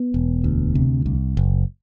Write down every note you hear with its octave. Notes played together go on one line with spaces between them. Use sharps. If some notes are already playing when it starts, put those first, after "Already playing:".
Already playing: B3
E1
D2
C3
C2
F#1